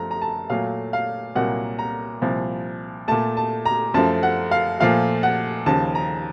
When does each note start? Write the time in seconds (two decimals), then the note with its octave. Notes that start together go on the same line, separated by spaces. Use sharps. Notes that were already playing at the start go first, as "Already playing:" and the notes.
Already playing: F#2 F3 A3 A#5
0.11 A#5
0.22 A5
0.50 A#2 F#3 A3 F5
0.93 F5
1.35 C2 A#2 F#3 A#3 F#5
1.79 A#5
2.22 C2 A#2 F3
3.08 A#2 A3 A5
3.37 A5
3.66 A#5
3.94 F#2 F3 A3 A5
4.23 F#5
4.51 F5
4.80 A#2 F3 A3 F5
5.23 F#5
5.66 D#2 C#3 F3 A5
5.95 A#5